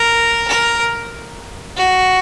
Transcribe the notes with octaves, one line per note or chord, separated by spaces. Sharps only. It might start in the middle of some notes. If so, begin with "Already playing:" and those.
Already playing: A#4
A#4
F#4